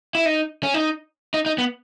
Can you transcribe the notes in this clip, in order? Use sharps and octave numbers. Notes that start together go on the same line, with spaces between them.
E4
D#4
C#4
D#4
D#4
D#4
B3